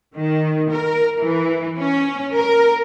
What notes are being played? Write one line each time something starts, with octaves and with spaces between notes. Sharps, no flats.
D#3
A#4
E3
C#4
A#4